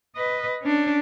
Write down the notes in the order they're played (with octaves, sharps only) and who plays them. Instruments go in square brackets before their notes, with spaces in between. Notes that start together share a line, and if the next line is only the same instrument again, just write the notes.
[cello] B4 D#5
C#4 D4